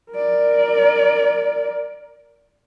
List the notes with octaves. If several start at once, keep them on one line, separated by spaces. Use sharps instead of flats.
A#4 D5